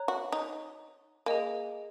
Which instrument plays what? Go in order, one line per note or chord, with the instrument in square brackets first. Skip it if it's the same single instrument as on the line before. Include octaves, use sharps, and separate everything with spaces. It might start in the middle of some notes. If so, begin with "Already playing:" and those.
Already playing: [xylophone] C#5 A#5 F#6
[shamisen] F#4
D#4
[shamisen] A#3 [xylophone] G#4 D#5 G#5